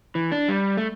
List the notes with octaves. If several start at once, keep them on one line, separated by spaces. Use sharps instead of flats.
E3
D4
G3
A3